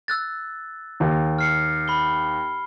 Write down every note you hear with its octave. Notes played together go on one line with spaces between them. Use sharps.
E6 F#6 A6
D#2
F6 C7 C#7
B5 G7